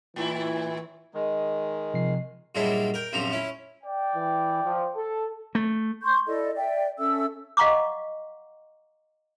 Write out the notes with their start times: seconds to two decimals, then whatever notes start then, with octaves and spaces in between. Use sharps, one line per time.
0.16 A2 E3 E4
1.14 D#3 G#3
1.94 C3 F3 C7
2.55 G2 A#2 F#3 G#3 D4 E4
2.94 A#4 G5
3.13 A#1 F#2 C3 F3 A#5
3.32 C#4 E4
3.83 D5 G5
4.15 E3
4.64 F3
4.96 A4
5.55 A3
6.02 C6 C#6 G6
6.27 E4 A4 D5 D#5
6.55 D5 E5 G5
6.98 C#4 A4 E5 E6
7.57 D#5 F5 F#5 A#5 C#6 D6